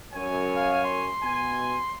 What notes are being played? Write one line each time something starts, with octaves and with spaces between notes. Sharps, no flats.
F#2 C#5 G#5
F5
C6
B2 G#5